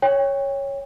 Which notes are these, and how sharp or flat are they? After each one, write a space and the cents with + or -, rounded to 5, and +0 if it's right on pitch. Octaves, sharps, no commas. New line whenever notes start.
C#5 +0 G5 +30